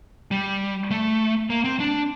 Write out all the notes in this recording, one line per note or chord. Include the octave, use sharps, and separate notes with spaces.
G3
A3
A#3
C4
D4